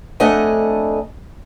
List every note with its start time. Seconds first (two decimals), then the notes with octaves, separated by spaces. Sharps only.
0.20 F2 A3 D4 D#5 F#5 G#5